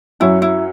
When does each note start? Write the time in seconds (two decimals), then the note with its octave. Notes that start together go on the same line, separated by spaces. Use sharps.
0.20 F#2 F#3 C#4 E4
0.42 E4